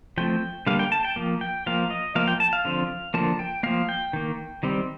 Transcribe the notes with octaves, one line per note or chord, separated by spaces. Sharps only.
F3 A3 C4 G5
D3 G3 A#3 F5
G5
A5
G5
F3 A#3
G5
F3 A#3 F5
D#5
F3 A#3 F5
G5
A5
F5
D3 F3 C4
D3 F3 A#3 A5
G5
F3 A#3 F5
G5
D#3 A#3
D#3 G3 C4